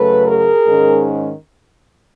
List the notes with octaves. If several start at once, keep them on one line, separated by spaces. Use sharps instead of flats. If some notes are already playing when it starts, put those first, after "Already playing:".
Already playing: F#2 C#3 F#3 A3 A4 B4
G#4 A#4
G#2 D#3 G#3 C#4